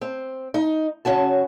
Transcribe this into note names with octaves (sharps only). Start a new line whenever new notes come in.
C4
D#4
C#3 C#4 F#4 A5